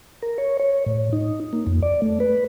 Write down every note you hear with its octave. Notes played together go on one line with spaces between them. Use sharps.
A#4
C#5
C#5
A2
D#4
A#3
F2
D5
A3
B4